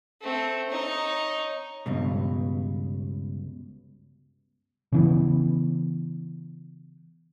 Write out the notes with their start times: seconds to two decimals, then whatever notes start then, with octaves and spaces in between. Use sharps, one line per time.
0.22 A3 C4
0.70 D#4 C#5
1.86 C#2 G2 B2
4.92 C#3 E3 B3